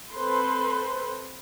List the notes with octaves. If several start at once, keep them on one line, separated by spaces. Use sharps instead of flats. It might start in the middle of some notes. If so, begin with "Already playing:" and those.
C4 A4 B4 C5 C6